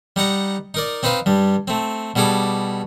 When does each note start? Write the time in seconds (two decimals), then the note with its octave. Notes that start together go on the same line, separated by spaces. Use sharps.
0.16 G3 D#4 F#5 A#5
0.74 D#4 A#4 D5
1.03 C4 D#4 B4 C5 F5
1.26 G2 G3
1.68 A3 C4
2.16 B2 G3 G#4 A4 D6